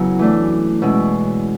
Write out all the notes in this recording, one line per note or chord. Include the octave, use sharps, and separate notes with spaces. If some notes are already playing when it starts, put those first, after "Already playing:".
Already playing: C#3 F#3 B3 E4
E3 A3 D4
B2 G#3 C#4 E4